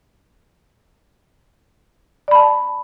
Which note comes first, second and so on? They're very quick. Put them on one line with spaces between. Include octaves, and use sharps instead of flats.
D5 B5 A5